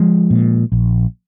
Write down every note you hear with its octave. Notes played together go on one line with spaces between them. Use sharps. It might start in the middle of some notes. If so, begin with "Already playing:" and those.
Already playing: F3 G#3
A#2
A#1